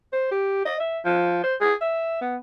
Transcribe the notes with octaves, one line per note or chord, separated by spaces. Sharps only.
C5
G4
D#5
E5
F3
C5
G#4
E5
B3